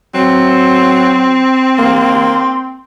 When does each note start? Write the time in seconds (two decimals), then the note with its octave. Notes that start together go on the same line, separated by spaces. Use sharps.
0.14 F#3 C4
1.78 A#3